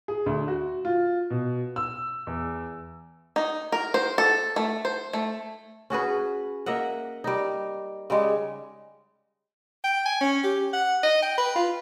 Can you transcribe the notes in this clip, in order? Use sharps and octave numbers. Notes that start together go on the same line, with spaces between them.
G#4
D2
F#4
F4
B2
E6
E2
D#4
A#4
C5
A4
A3
C5
A3
C#4 F#4 G#4 B4
A#3 D#5 E5 F#5
G3 D#4
C#3 G3 G#3
G5
G#5
C#4
G4
F#5
D#5
G5
B4
F4